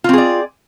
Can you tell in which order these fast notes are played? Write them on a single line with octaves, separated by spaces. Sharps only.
F4 C4 G#4 D5